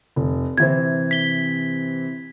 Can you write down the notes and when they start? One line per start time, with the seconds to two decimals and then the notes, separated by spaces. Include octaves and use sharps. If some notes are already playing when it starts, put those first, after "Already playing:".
0.16 F1
0.58 C3 E3 C4 G#6
1.11 B6 G7